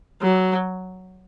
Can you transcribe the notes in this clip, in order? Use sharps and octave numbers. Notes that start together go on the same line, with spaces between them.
F#3